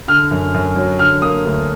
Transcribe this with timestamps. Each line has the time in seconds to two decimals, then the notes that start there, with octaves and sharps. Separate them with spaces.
0.08 D3 F6
0.31 F#2
0.54 F#2
0.76 F#3
0.99 D3 F6
1.22 A#3 D#6
1.45 D2